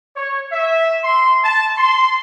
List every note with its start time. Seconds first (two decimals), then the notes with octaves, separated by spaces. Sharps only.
0.16 C#5
0.51 E5
1.04 C6
1.43 A5
1.78 C6